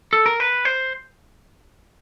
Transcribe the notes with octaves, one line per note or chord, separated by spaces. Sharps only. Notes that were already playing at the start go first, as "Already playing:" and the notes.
A4
A#4
B4
C5